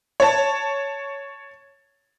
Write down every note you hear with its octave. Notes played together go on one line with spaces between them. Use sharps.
C#5 A5